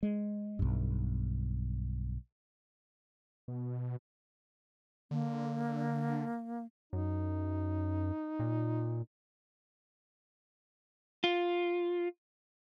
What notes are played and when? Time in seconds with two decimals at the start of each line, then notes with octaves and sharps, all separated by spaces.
0.03 G#3
0.59 B1 G2
3.48 B2
5.11 D3 A#3
6.93 F#2 D#4
8.39 A#2
11.24 F4